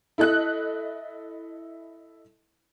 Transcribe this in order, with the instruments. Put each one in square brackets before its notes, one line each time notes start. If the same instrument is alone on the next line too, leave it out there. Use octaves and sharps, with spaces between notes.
[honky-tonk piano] E4 A4 D#5 F#6